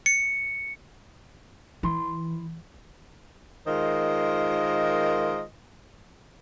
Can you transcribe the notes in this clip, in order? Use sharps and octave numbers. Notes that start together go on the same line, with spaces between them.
C#7
E3 E4 C6
D#3 G#3 F4 A#4 C5 D#5